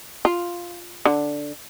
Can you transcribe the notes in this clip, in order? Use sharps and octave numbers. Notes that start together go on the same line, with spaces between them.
F4
D3